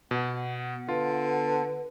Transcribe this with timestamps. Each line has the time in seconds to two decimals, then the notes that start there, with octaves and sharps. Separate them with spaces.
0.11 B2 B3 F#5
0.89 D3 F4 B4